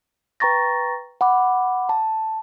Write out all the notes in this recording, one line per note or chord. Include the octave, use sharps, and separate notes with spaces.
B4 G5 A#5 C#6 A6 A#6
F#5 B5 D6
A5